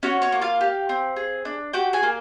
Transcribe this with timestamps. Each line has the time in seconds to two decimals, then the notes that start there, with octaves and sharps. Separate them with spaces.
0.03 C#4 F#4 C#5
0.22 C#4 C#5
0.32 A#3
0.41 F4 F5
0.61 G4
0.89 C4
1.16 G#4
1.45 D4
1.73 F#4 G4 G5
1.93 G#4 G#5
2.03 A#3